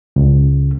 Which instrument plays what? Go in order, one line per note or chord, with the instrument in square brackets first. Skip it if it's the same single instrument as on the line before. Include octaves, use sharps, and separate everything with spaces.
[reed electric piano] C#2